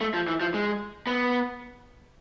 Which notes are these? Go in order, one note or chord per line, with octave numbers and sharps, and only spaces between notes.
A3
F3
E3
F3
G#3
B3